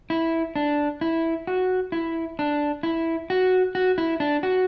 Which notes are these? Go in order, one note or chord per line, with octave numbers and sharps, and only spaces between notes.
E4
D4
E4
F#4
E4
D4
E4
F#4
F#4
E4
D4
F#4